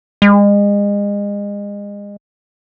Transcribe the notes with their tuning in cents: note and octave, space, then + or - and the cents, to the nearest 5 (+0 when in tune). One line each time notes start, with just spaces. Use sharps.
G#3 -35